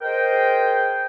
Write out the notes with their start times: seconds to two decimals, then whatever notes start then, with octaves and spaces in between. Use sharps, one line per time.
0.02 G#4 A#4 C5 D#5 G5